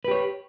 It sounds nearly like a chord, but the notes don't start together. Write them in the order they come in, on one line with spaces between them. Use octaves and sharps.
B4 G4 C#5